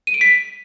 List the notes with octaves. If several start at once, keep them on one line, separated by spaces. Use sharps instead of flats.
D#7
D7
B6